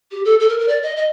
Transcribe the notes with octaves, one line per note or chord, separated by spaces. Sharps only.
G4
A4
A4
A#4
A#4
D5
D#5
D#5